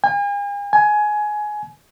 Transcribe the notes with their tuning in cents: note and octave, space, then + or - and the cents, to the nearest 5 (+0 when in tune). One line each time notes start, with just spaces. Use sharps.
G#5 -40
G#5 +20